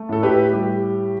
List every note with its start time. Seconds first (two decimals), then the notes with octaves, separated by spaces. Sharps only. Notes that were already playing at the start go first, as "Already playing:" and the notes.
Already playing: A3
0.09 A2 A4
0.23 G4 B4
0.52 G3 G4